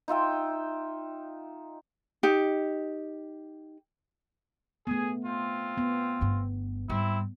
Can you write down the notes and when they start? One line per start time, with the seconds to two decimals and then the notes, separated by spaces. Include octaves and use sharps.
0.08 D#4 F4 E5 G5
2.23 D#4 G4
4.87 A3 B3 G#4
5.25 C4 F4
5.78 B3
6.21 G1 G2
6.89 G#2 G3 C4 E4